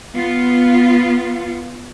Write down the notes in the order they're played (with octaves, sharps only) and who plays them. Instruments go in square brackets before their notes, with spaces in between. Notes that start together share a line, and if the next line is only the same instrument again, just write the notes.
[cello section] B3 F4